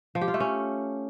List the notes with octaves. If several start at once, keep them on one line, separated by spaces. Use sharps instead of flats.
F3
G4
F4
A3
C#4